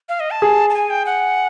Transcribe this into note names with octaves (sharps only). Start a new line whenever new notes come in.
F5
D#5
A5
G#4
A5
G#5
G5
F#5